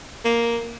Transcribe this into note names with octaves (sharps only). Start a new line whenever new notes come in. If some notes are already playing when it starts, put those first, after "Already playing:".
A#3